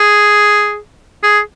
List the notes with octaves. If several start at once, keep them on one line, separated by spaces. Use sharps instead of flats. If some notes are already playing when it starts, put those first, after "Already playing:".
Already playing: G#4
G#4